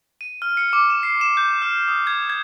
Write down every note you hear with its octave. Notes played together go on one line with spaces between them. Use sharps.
D#7
F6
C#7
D6
E7
C7
E7
G6
F6
D#6
G#6
G#6